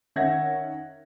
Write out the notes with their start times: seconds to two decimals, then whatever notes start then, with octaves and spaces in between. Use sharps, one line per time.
0.16 D#3 C#4 E5 F#5 G#6 A#6